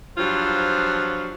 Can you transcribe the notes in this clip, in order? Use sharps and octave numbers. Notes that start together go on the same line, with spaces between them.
G2 F3 F#3 F4 C5